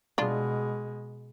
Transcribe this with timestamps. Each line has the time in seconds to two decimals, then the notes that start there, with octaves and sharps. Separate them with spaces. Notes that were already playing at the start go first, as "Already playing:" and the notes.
0.18 B2 G#3 D4 F4